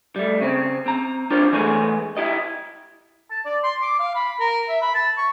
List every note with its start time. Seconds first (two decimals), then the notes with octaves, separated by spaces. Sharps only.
0.16 G3 A3
0.41 C#3 C4
0.86 C4 A#5
1.31 D4 F4 G4 A#4 C5 C#5
1.52 E3 G#3 A3 B3 G#4 C#5
2.17 E4 G4 D#5
3.31 A5
3.45 D5
3.63 C6
3.82 D6
4.00 F5
4.15 B5
4.40 A#4
4.68 E5
4.81 B5
4.94 A5
5.18 C#6